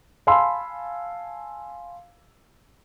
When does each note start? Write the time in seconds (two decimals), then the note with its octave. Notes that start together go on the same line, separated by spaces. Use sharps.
0.27 F5 G#5 A5 B5 C6 E6